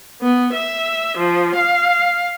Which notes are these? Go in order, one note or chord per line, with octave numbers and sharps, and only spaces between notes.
B3
E5
F3
F5